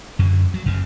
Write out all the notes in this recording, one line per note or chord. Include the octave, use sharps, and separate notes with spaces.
F#2 D3 F#3
F#3
F#1 F#2 C#3